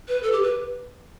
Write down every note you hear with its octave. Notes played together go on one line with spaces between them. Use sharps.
B4
A4
G4
B4